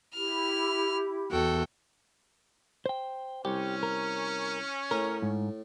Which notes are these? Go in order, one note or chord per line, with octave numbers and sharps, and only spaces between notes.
E4 G4 F6
E2 F#4 A4 G5
C5 G5
C2 C#4 G4
A#4
A2 A#4
G#2